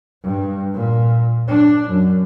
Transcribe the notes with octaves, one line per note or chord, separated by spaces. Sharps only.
G2
A#2
D4
F#2